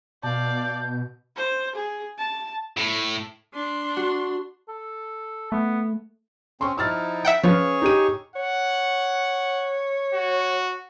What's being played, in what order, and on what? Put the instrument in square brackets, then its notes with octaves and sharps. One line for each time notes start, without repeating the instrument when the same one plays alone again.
[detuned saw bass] B2 [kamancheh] D5 F5 [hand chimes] A5 [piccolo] G6
[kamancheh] C5
G#4
A5
[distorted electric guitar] A2
[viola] D4 C6
[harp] F#4
[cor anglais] A4
[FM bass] A3 [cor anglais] B3
[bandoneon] C4 C#4 [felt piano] C6 C#6
[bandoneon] F3 D#4 E4 [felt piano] E6 F6 A6
[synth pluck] E5 F#5 G5
[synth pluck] F3 [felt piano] C#4 B4 F5 [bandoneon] G#4 C#5 C#6
[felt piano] D#4 G4 D#7
[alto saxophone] C#5 [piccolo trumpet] F#5
[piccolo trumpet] F#4